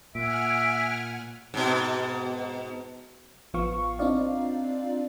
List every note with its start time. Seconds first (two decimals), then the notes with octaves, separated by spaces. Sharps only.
0.15 A#2 E5 F#5 G#5 F6 D7
1.54 G#2 B2
3.54 A1 F3 B3 F5 C#6
3.99 C4 D4 D#4 F4 D5 F5